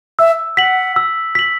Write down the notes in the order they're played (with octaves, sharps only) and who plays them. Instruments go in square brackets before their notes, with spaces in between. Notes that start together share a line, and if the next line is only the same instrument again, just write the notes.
[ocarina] E5 [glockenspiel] E6
[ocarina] F#5 [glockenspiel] B6 F#7
[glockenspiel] E6
B6 F#7